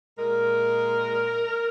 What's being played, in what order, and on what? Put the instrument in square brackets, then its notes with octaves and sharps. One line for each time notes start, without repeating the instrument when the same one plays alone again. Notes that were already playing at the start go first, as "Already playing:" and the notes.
[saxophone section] A#2 G#3 A#4